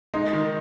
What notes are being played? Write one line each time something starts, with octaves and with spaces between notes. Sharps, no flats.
G#3 D#4
D#3